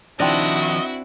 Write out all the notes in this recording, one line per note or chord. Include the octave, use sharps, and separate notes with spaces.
D#3 F3 C4 D4 E4 F#4 D#5